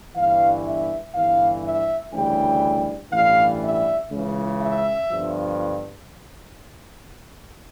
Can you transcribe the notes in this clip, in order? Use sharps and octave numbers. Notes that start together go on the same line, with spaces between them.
G1 G2 E3 F5
E5
G1 G2 E3 F5
E5
D2 C#3 E3 G3 G5
A1 G2 E3 G3 F5
E5
C#2 C#3 E3
E5
G1 G2 F3